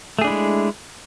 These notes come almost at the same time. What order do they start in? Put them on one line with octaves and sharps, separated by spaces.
A3 G#4 D4 E4 G#3